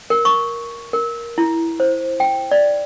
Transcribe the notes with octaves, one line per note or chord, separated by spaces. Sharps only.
A#4
C#6
A#4
E4
C5
G5
D5